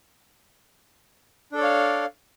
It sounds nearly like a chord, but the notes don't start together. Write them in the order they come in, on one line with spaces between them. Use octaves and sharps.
D4 A4 D5 C#5 F5